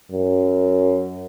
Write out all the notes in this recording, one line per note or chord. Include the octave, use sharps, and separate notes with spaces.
F#2